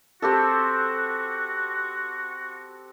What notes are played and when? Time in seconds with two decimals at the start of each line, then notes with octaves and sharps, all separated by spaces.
0.22 C4 F#4 G4 A4